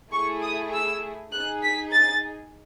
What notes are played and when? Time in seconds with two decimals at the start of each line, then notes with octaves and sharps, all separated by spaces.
0.13 A3 E4 G#4 C#6
0.43 D#6
0.73 E6
1.33 D#4 G#4 F#6
1.63 B6
1.93 A6